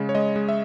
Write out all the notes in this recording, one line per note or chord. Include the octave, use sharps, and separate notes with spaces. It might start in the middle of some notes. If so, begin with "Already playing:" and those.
Already playing: C#3 G#3
C#5
G#3 D#5
G#3
E5